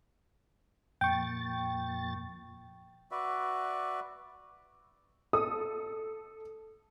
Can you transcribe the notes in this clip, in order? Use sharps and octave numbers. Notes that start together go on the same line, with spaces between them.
F2 A#2 G5 C#6 A6
F#4 B4 D5 E5
A4 D#6